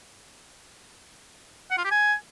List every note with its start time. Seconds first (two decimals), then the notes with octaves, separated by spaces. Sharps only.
1.71 F#5
1.78 F4
1.84 G4
1.91 G#5